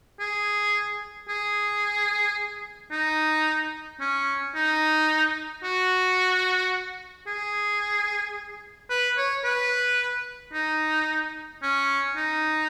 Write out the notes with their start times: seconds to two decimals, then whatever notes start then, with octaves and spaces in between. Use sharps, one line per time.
0.20 G#4
1.29 G#4
2.92 D#4
4.01 C#4
4.55 D#4
5.63 F#4
7.27 G#4
8.90 B4
9.17 C#5
9.45 B4
10.53 D#4
11.63 C#4
12.17 D#4